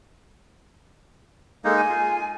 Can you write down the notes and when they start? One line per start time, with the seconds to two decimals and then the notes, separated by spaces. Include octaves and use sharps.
1.65 G#3 A#3 D#4 A4
1.76 G#5
1.90 F4